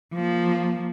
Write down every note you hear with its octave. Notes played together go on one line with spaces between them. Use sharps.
F3 A#3